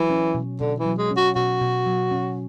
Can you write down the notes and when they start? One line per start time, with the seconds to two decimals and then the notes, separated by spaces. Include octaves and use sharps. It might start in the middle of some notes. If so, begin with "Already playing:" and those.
Already playing: E3 F#3
0.10 C#4
0.35 B2
0.60 B2 D3
0.80 E3
0.86 F#3
0.98 G#3
1.10 C#4
1.17 F#4
1.36 B2 F#4
1.61 B2
1.86 F#3
2.11 C#4